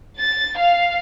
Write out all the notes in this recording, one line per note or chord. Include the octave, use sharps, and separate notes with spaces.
A6
F5